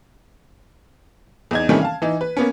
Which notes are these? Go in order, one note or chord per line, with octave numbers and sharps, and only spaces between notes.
E2 D#4 G#6
C3 D#3 E3 G3 A3 C#4
F5 A5
E3 D#4
B4
A#3 B3 C#4